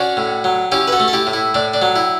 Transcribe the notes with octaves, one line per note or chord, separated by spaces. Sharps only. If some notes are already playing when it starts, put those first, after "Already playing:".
Already playing: C#4 D4 F#4
A2
F#3
C#4 E4 G4
B4
F#4 A4
A3
A4
E4 G4
A2
E4
A2 D4
D4
F#3
E4